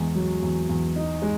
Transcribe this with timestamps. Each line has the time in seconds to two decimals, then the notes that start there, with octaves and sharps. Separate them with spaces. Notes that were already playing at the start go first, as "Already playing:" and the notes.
Already playing: E2 G#3
0.15 F#3
0.42 E2
0.69 E2
0.96 D#4
1.22 G#3